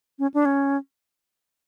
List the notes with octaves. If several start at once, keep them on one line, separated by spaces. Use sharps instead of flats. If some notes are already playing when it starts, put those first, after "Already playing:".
C#4
D4
C#4